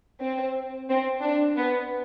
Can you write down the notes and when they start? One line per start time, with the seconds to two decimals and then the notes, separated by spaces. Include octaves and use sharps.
0.21 C4
0.89 C4
1.22 D4
1.56 B3